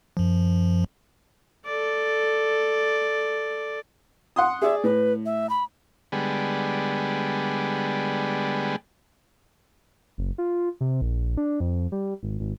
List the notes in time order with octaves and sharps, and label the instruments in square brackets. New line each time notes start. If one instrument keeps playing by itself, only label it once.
[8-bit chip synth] F#2 F3
[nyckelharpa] A4 D5
[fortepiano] F#5 C6 D#6
[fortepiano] G#4 D5 [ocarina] E5
[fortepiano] A2 [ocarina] B4
[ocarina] E5
B5
[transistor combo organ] D3 G3 G#3 B3
[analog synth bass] F#1
F4
C3
A#1
D4
F2
G3
G#1
G#1